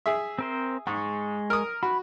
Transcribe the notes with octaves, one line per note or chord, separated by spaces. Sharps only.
G#4 E5
C4 A#4 C5
G#2 G#3 C#6
A#4 D#6
F#4 B5